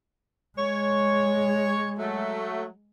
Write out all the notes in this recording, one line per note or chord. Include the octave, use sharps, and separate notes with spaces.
G#3 C#5
F#3 A3